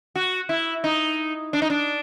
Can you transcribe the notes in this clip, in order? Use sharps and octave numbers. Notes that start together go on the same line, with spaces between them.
F#4
E4
D#4
D4
D#4
D4